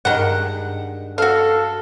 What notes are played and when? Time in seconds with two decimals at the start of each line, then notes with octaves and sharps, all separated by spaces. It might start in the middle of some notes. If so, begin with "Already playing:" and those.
0.05 G2 D#3 G#3 F#5 G5
1.18 F#4 A4 F5